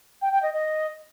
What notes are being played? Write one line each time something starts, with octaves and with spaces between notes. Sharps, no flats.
G5
G5
D#5
D#5